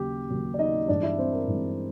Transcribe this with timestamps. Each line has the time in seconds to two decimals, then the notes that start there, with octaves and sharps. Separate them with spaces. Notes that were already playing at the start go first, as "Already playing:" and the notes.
Already playing: D#2 C#3 F#3 G4
0.30 D#2 C#3 F#3
0.54 D5
0.59 D#4 D#5
0.88 G2 E3 G#3 D4 D5
1.03 E4 E5
1.18 C4 C5
1.33 A#4
1.47 G2 E3 G#3